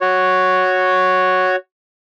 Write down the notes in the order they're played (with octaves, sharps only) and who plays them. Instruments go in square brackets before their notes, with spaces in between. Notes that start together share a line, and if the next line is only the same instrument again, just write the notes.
[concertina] F#4 C#5